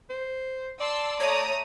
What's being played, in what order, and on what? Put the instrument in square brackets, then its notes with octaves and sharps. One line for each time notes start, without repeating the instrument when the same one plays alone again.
[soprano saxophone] C5
[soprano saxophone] D5 [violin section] A5 C6 E6
[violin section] A3 A#5 D#6 [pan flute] C#5